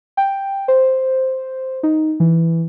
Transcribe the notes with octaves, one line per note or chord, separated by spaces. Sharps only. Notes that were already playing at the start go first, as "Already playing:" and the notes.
G5
C5
D#4
E3